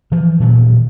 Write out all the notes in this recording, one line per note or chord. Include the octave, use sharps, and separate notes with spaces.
E3 F3
A#2 D#3 F#3 B3